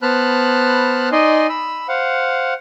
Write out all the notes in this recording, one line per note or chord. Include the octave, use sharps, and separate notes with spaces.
B3 C5 A5 B5 F6 F#6
D#4 D5 D#5 G#5 C6
B5 E6
C5 F5 F#5